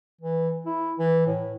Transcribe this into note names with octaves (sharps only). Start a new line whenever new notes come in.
E3
E4
E3
A2